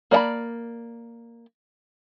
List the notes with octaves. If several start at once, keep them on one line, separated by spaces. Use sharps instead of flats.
A#3 D5 D#5 A5 B5